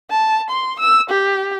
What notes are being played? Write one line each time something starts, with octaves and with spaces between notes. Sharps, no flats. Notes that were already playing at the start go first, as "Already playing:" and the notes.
A5
C6
E6
G4